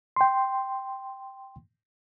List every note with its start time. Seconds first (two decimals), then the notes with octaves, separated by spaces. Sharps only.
0.16 G5 C6